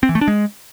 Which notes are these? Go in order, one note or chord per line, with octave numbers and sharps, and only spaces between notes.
C4
E3
A3
D4
G#3